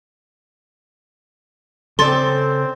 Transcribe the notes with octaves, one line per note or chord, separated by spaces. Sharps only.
C#3 C4 A4 D5 C6 A6